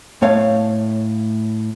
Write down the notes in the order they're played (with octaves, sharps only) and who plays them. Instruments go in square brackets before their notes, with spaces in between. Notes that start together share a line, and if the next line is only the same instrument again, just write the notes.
[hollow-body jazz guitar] A2 A3 C#5 F5